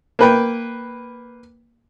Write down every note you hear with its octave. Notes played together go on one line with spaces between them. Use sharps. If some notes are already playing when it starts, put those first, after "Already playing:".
A#3 B4 G5